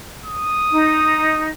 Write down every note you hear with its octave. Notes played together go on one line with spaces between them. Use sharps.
D#6
D#4